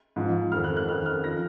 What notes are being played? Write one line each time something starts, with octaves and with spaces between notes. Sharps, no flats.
G#2 F3
F2 D#3 F6
F#6
F#6
F2 D#3 F6
F6
F3 A#6